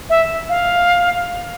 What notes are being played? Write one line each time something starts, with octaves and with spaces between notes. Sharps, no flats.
E5
F5